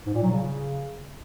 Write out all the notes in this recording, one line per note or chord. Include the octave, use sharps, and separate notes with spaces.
G#2
A#2
F#3
C#3